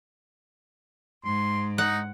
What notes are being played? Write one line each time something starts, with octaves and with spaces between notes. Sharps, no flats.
G#2 C6
D#4 F#5